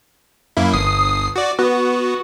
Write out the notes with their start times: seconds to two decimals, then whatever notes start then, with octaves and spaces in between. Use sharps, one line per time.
0.57 F#2 A#3 E4
0.73 G1 D#6 C7
1.36 F#4 D5
1.59 B3 F#4